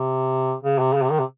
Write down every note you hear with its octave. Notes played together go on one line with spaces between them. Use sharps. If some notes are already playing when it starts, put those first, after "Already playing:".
Already playing: C3
C#3
C3
C#3
C3
D#3
C3